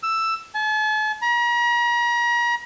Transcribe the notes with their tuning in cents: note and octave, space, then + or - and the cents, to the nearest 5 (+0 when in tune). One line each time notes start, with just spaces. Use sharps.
E6 +10
A5 -45
A#5 +40